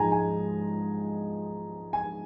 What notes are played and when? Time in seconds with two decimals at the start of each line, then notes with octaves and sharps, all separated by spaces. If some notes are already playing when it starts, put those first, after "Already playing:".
Already playing: G#2 F3 G#3 D#4 G#5 A#5
0.12 G#5
1.93 G#5